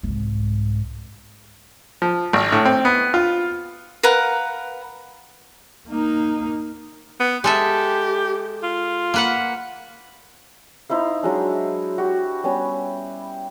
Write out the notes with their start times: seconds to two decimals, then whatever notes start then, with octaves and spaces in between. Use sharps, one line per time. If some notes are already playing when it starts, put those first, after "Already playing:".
0.03 C2 G#2
2.02 F3
2.33 G#1
2.52 A2
2.65 C4
2.85 B3
3.14 F4
4.03 A#4 B4 F5 F#5
5.89 A#3 D#4
7.20 B3
7.44 G#3 G4 A4 E5
8.63 F4
9.14 A#3 B4 F#5
10.90 D#4 E4 C5 F5
11.23 F#3 G#3 D4
11.98 F#4 G4
12.44 G3 B3 C#4